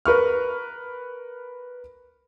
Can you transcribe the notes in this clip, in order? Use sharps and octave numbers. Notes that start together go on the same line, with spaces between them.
A#4 B4 C#6 F6